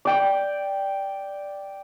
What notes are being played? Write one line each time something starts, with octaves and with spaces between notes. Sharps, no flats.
D5 G5